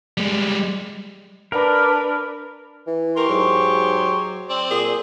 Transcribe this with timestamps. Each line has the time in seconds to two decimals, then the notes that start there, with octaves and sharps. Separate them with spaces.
0.17 G3 G#3
1.52 D4 A#4 B4
2.87 E3
3.17 G4 A#4 C6 C#6
3.29 G#2 F#3
4.50 C4 D5
4.71 A#2 G#4